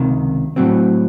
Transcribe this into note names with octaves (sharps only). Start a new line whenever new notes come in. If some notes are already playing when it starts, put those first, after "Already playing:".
Already playing: C#2 C3 D#3
A2 F#3 C4